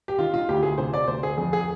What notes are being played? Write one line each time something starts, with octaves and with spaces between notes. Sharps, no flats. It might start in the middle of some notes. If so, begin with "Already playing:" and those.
G4
D#3 F4
F4
D2 G4
G#4
C3 C5
D5
D2 C5
G#4
F2 G#4
G#4